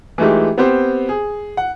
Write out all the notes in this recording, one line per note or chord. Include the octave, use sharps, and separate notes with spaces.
E3 G#3 A3 D#4 F4 G4
B3 C4 G4 C5
G#4
F#5